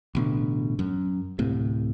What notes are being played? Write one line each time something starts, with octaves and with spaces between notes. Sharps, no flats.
A1 B2 D3
F#2
D1 A2 C3